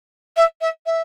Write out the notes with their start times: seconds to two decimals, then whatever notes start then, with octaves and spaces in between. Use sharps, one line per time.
0.36 E5
0.61 E5
0.86 E5